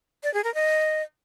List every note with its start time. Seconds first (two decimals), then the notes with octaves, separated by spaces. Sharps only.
0.23 D5
0.34 G#4
0.44 A#4
0.54 D#5